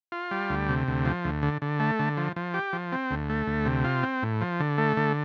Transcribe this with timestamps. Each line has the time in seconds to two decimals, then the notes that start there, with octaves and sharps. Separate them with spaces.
0.12 F4
0.31 G3
0.50 D2
0.69 C3
0.88 D2
1.05 F3
1.24 D2
1.43 D3
1.62 D3
1.80 A3
1.99 D3
2.17 F3
2.36 F3
2.54 G4
2.73 F3
2.92 C4
3.11 D2
3.29 A3
3.47 D2
3.66 C3
3.84 F4
4.03 C4
4.23 A2
4.41 F3
4.60 D3
4.78 A3
4.97 D3